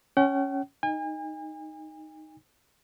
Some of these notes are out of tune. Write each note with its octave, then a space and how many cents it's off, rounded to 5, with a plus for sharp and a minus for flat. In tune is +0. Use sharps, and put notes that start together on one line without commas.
C#4 +0 G5 -45
D#4 +0 G#5 -40